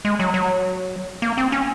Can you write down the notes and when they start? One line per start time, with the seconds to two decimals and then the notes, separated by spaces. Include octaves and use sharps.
0.05 G#3
0.20 F#3
0.34 F#3
1.22 A#3
1.38 C4
1.52 C#4